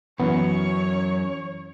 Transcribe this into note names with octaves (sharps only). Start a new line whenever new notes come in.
F#2 E3 B3 C#5